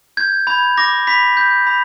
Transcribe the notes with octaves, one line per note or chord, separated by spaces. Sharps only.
G6 G#6
B5 G#6
D6 A#6
B5 B6
G6
B5